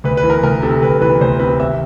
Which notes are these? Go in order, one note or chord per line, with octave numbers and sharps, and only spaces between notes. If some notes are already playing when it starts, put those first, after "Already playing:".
D2 B4
B4
E3
A#4
D2 A#4
C3 A4
D2 B4
E3 B4
D2 C5
C3 B4
G#1 E5